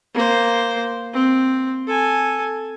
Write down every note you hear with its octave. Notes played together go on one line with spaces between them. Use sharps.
A#3 C5
C4
A4 G#5